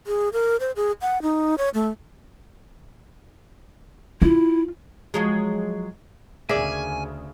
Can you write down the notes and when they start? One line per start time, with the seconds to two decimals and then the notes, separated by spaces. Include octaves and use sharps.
0.07 G#4
0.33 A#4
0.60 C5
0.76 G#4
1.02 F#5
1.22 D#4
1.58 C#5
1.74 A3
4.22 E4 F4
5.14 F3 F#3 G#3
6.49 D2 C#3 A#3 G#4 D5 E5 G#5